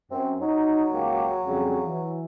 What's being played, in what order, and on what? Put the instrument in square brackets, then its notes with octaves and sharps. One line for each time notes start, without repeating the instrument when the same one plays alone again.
[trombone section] F#2 [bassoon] C4
[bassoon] F#3 [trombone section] D#4
[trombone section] C#2 A#3 G4
F2 C#3 G3
E3